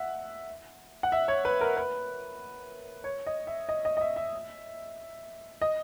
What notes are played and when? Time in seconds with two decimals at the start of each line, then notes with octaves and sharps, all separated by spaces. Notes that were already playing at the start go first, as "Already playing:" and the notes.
Already playing: E5 F#5
1.03 F#5
1.12 E5
1.28 C#5
1.45 B4
1.61 A#4
1.77 B4
3.04 C#5
3.27 D#5
3.47 E5
3.69 D#5
3.85 D#5
3.97 D#5
4.01 E5
4.16 E5
5.62 D#5